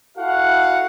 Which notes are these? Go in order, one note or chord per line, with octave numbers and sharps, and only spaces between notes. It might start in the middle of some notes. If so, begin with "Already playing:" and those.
E4 F#4 A4 F5 F#5